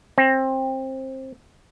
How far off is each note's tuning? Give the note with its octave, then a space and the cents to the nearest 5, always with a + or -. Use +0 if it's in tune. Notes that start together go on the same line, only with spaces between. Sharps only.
C4 +20